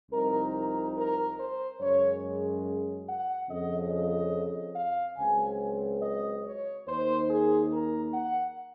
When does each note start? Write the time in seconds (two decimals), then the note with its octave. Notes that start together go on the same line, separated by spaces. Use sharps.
0.10 C2 C3 F3 C4 D#4 A#4
0.54 A#4
0.96 A#4
1.37 C5
1.80 F#2 C#3 G#3 C#5
3.06 F#5
3.48 F2 C#3 F3 D#5
3.91 D#5
4.74 F5
5.17 C#2 C#3 F#3 C4 G#5
6.00 D#5
6.43 C#5
6.86 D#2 D#3 A#3 D#4 C5
7.27 G#4
7.70 A#4
8.11 F#5